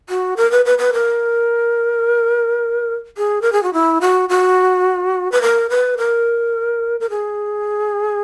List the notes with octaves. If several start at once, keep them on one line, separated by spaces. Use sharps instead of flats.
F#4
A#4
B4
B4
B4
A#4
G#4
A#4
G#4
F#4
E4
F#4
F#4
B4
A#4
B4
A#4
A#4
G#4